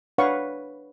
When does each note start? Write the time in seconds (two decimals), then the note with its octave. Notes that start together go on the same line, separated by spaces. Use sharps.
0.18 D4 B4 C#5 F5 F#5 C#6